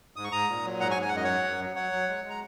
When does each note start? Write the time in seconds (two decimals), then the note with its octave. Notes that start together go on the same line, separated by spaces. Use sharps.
0.16 G#2 D#6
0.24 C#6
0.32 G#2 A#5 D#6
0.49 A#2
0.65 F#3
0.80 G#2 F#5 A#5
0.91 G#5 C#6
0.96 G#2
1.02 G#5
1.08 F#5
1.12 F#2 D#5
1.24 F#3 C#5 F#5
1.44 F#2
1.60 F#3
1.76 F#3 C#5 F#5
1.92 F#3
2.08 G#3
2.24 G#3
2.30 A#5